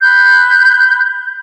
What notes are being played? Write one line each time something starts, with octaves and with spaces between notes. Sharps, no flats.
B5 F#6 G6